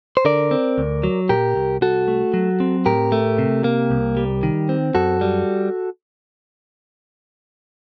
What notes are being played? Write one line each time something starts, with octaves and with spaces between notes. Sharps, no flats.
C5
D3 A#4 D5
C4
D2
F#3
A#2 G4 A#4
C2
C2 F#4 A4
A3
F#3
C4
A2 G4 A#4
A3
C3
A#3
C2
G3
D#3
C4
F#2 F#4 A4
G3